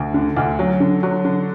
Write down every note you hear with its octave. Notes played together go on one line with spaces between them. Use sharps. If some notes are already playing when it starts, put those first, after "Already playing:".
Already playing: D2
D3
D2
F#3
D3
F#3
D3